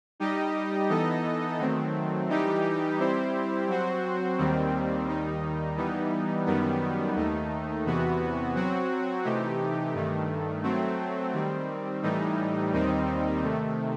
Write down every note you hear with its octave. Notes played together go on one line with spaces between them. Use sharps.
G3 D#4 G4 D#5
E3 B3 D#4 A4 D#5
D#3 F#3 A3 C4
E3 G3 D#4 G4
G3 C4 E4 G4 C5
F#3 C4 F#4 C5
D#2 D#3 G3 C4
D#2 D#3 G3 D#4
E3 G3 B3 D#4
F#2 D#3 G3 B3
D#2 D#3 A3 D#4
E2 C3 E3 B3 F#4
F#3 C4 F#4
C3 E3 A3 D#4 G4
G2 D#3 A3
F#3 A3 C4
D#3 G3 C4
A2 E3 G3 D#4
D#2 D#3 G3 C4 D#4
C3 D#3 A3